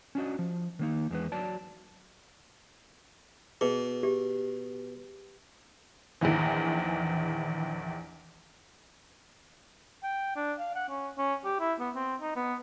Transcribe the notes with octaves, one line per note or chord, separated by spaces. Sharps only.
C#4 D4 F#4 D#5
F3
D#3 A#3 D#4
E2 G#3 B4
F#3 D5 A5
B2 G#4
G4
A#1 E2 D#3 E3
G5
D4
F5
F#5
C#4
C#4
G4
E4
B3
C4
D#4
B3